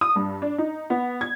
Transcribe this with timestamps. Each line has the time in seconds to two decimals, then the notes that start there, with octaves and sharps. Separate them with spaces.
0.01 D#6
0.16 G2
0.42 D4
0.58 D#4
0.90 B3
1.21 G#6